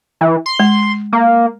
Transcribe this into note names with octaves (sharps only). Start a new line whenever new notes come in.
E3
C6
G#3
A#3